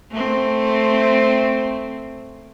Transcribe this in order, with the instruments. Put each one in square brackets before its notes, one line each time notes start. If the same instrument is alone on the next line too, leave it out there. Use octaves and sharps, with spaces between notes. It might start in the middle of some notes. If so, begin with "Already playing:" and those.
[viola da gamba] A3 C4